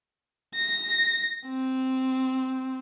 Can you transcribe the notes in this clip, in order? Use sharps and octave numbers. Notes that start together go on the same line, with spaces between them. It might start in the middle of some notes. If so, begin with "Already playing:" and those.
A#6
C4